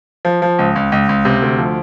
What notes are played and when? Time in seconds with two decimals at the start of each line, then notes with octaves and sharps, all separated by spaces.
0.25 F3
0.42 F3
0.59 C#2
0.76 C#2
0.92 C#2
1.09 C#2
1.25 C3
1.42 D2
1.58 F3